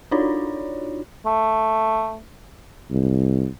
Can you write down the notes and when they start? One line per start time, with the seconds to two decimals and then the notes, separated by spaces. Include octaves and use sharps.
0.11 D4 D#4 F4 F#4 C#5 D5
1.26 A3
2.91 C2